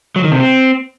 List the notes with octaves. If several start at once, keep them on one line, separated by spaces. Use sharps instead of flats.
F#3
D#3
C3
C4